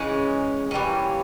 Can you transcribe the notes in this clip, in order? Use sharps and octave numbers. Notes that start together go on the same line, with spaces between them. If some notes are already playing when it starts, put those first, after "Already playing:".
Already playing: C#3 E3 G#3 C#4
E3 G3 A#3 C#4